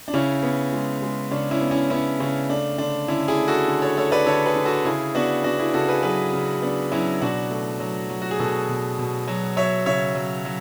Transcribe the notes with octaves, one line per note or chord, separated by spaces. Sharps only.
D4
C#3 C#4 E4
B3
G#3
G#3
C#3 D4
C#4 E4
B3
C#4 E4
B3 C#4 E4
C#3 C#4
A3 D4
D3 D4
D3 C#4 E4
E4 G#4
A3
F#4 A4
D3
A4 C#5
A3 A4 C#5
B4 D5
D3 A4 C#5
G#4 B4
D3
F#4 A4
C#3 E4 G#4
B3 D4 F#4
B3 D4 F#4
E4 G#4
C#3 F#4 A4
G#4 B4
F#3 G#4 B4
C#3
B3 D4
F#3 C#4 E4
B2 D4 F#4
A3
F#3
F#3
F#4
G#4
B2 F#4 A4
B2
B2
F#3
F#3 C#5 E5
C#3 C#5 E5
F#3
F#3